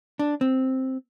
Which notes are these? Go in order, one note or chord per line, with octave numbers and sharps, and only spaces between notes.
D4
C4